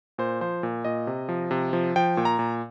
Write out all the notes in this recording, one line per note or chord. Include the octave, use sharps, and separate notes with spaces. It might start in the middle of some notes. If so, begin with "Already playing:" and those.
A#2 C5
F3 C5
A#2
A#2 D#5
C3
F3
C3
F3
F3 G5
A#2
A#5
A#2